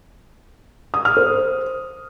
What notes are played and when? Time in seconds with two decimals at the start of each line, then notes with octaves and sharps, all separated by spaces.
0.94 D#6
1.05 F6
1.17 C5